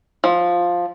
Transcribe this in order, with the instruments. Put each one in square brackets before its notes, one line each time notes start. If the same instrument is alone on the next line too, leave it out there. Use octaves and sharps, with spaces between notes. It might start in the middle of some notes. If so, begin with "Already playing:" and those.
[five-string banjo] F3